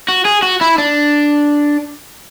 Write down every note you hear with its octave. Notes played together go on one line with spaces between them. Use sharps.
F#4
G#4
F#4
E4
D4